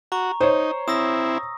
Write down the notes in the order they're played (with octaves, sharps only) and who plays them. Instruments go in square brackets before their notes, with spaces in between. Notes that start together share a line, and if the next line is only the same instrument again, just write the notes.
[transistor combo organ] F#4 [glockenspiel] A#5 C#6
[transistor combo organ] D#4 [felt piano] C5 C#5
[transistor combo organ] C4 E4 [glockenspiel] D#6 E6 A#6